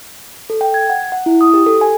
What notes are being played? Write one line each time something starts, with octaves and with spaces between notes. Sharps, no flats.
A4
G5
G#6
F#5
F#5
E4
D#6
G4
A4
G#5